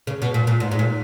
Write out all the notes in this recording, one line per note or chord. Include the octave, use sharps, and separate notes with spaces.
C#3
B2
A#2
A#2
G#2
G#2
A#2